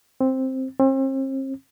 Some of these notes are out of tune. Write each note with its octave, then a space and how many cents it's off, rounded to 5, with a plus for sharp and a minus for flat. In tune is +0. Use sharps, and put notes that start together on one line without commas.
C4 +5
C4 +40